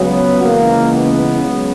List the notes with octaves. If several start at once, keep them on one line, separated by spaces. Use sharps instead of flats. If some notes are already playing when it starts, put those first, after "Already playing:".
Already playing: C#2 C#3 F#3 B3
C#2 C#3 E3 G#3 A#3
B3
C#2 C#3 F#3